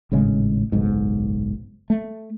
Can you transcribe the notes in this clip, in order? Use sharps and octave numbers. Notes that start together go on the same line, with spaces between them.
G#1 A2 C#3 G#3
F#1 B1 G#2
A3